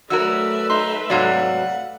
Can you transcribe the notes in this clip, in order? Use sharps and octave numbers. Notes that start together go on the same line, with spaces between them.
F#3 A3 F#4 A#4 B4 D5 E5 E6
D#4 C6
G#2 C3 F#3 D5 F5 F#5